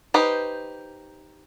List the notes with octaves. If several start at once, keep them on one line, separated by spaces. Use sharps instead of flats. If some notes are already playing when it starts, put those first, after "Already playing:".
D#4 G4 B4 C5